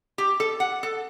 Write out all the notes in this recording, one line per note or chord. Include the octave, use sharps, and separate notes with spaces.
G4
A4
F#5
A4